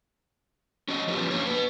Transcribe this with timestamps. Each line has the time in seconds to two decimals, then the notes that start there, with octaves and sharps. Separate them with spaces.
0.88 C#4 F#4 D#5
1.07 F3 G3 B3 C#4 F4 G4
1.31 F2 A3 A#3 D4 C#5
1.46 F#4 B4